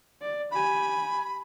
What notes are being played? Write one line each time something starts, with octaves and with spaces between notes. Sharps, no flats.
D5
G4 G#5 B5